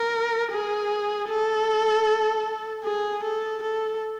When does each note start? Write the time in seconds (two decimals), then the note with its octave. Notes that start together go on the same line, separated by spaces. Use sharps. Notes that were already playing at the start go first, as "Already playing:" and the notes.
Already playing: A#4
0.51 G#4
1.29 A4
2.84 G#4
3.23 A4
3.63 A4